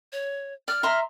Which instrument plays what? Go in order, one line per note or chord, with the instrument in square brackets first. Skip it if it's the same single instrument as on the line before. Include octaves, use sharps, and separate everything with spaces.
[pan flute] C#5
[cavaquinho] D5 [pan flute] F6
[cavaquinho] E5 A#5 C6